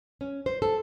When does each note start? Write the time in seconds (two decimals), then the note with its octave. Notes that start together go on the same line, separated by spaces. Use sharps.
0.21 C#4
0.46 C5
0.62 A4